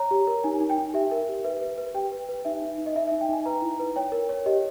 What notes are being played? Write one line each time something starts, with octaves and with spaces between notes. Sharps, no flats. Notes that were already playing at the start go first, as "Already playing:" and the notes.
Already playing: C#5 A#5
G4
A#4
D#4 G#5
D#4
G5
D#4
G4 E5
A#4
G4
B4 E5
B4
B4
G4 G5
B4
B4
D#4 E5
D#4
D#4
D#5
D#4 E5
E5
D#4
G5
D#4 G#5
B4 A#5
E4
B4
C#5 G5
A#4
C#5
G4 D#5